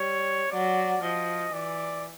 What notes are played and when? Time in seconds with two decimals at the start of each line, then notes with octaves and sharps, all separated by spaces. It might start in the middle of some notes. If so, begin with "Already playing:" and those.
Already playing: G3 C#5
0.51 F#3 D5
1.02 F3 D#5
1.53 E3 D5